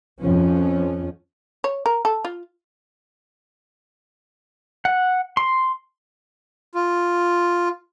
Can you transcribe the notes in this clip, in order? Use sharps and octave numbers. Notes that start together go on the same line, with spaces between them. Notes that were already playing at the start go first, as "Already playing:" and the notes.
F2 F3 C#4
C#5
A#4
A4
F4
F#5
C6
F4